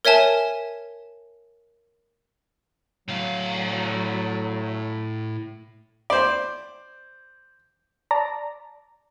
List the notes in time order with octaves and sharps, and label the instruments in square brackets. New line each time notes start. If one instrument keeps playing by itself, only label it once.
[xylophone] A#4 C#5 E5 G#5 A5
[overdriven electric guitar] A2 F5 [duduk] F#3
[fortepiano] C5 D5
[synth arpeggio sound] D5 A5 A#5